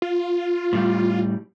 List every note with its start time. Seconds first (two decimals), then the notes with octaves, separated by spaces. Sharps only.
0.02 F4
0.73 A2 G3